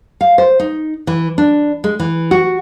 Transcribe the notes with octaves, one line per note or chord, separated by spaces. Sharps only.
F5
C5
D#4
E3
D4
G#3
E3
F#4